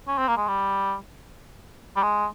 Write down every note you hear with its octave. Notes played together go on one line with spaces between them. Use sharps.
C#4
C4
A#3
G#3
G3
G3
G#3